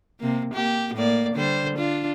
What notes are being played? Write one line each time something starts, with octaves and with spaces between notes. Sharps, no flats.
C3 A#3
A#3 G4
A2 A#3 D5
D3 G3 C5
D4 F4